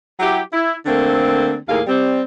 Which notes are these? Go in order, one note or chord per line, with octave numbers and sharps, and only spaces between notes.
F#3 E4 G4
E4
D3 A3 A#3 C4
D#2 A2 A#3 G#4 F5
G3 C4